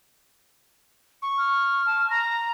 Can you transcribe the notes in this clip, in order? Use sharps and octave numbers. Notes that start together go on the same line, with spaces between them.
C#6
F6
A5
A#5 A#6